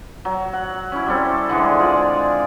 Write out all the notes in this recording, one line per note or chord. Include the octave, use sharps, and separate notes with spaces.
F#3
F#5
C#4 E4
G3 C4 A4
D3 E3 G#3
F4 G#4 D5